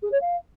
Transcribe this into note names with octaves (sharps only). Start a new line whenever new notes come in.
G#4
C#5
F5